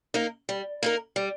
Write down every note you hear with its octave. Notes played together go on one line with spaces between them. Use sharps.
A#3 D#4 A#4
G3
A#3 D#4 A#4
G3